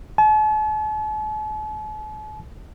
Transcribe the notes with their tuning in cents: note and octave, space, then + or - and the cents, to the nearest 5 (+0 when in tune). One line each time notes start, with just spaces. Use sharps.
A5 -45